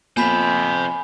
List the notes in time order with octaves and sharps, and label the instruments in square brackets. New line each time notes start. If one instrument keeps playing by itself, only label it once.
[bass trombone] F2 [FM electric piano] A#3 B3 F4 [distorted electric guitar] C5 E5 [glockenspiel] G#5 B5